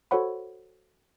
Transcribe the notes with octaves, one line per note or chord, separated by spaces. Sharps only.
F#4 A4 C5 C#5 F#5 B5